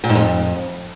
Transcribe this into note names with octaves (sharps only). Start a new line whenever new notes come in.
A#2
G#2
F2